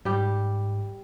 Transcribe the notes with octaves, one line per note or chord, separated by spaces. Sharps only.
G#2 G3 G4